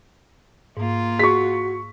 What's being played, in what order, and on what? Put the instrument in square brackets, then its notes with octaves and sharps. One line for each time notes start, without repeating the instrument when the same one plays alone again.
[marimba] G#2 [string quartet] A#3 F4
[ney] F#4 [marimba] G#4 [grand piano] C#6 B6